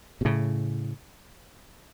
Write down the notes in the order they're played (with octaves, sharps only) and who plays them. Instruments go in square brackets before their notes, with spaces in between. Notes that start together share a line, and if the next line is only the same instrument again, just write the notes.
[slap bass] B2
A2 C#3